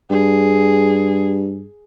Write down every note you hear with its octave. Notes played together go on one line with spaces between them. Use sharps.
G2 G#4